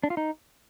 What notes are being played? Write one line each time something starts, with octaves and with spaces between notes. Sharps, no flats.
D4
F4
D#4